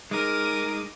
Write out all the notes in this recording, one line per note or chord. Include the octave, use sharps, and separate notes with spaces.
G#3 D#4 A#4 D6 D#7